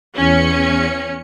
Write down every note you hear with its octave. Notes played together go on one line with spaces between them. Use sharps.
E2 C#4 C#7